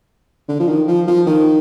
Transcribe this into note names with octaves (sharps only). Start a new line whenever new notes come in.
D3
F3
D#3
F3
F3
D#3